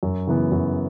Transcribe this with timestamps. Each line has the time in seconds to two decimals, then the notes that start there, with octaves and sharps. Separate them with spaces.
0.03 F#2
0.27 C#3 E3 B3
0.52 F#2